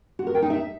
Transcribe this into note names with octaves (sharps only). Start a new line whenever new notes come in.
F#4
A#4
G5
D#4
E5